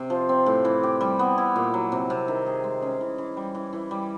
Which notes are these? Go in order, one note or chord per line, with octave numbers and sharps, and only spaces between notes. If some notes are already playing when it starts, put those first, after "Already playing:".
Already playing: C3
F3
C4
A2
E3
G4
G3
B3
E4
A#2
F#3
C3
C3
D#3
G#4
G#3
C#4
E3
E3
G3
E3
E3
G3